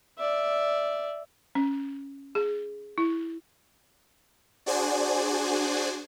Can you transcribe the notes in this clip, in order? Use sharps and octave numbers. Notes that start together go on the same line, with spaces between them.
D5 E5
C#4
G#4
E4
D4 F#4 G#4 C5 D5 G#5